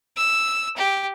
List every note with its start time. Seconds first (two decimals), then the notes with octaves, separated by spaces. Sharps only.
0.17 E6
0.77 G4